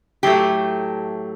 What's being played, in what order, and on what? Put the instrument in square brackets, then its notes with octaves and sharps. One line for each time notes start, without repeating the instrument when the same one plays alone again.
[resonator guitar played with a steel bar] A2 F#3 A3 G4